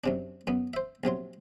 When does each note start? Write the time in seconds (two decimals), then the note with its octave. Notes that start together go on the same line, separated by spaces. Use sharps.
0.04 F#2 C3 D4
0.47 F#2 B3
0.74 C5 E5
1.04 A#1 C3 F#3 C6